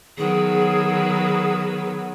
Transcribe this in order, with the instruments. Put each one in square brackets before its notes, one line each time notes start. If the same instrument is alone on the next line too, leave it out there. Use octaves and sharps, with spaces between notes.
[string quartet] D#3 F#3 B3 [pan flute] G#4